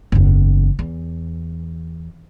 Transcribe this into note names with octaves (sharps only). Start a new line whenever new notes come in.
F#1 E2
E2